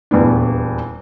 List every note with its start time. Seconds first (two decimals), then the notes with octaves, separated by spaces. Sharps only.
0.11 D#1 E2 B3 D4